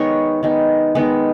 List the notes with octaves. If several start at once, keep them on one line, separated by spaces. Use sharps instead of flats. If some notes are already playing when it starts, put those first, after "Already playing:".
Already playing: D#3 G#3 B3 C#5
D#3 G#3 B3
D#3 G#3 B3